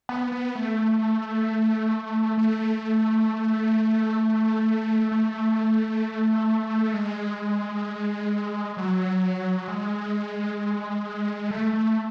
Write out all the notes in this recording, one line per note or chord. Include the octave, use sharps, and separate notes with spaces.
B3
B3
A3
A3
A3
G#3
F#3
G#3
A3
A3